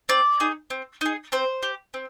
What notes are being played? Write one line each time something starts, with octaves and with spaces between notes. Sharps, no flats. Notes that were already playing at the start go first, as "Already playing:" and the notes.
C4 D5
D#4 G#4
C4
D#4 G#4
C4 C5
G4
C4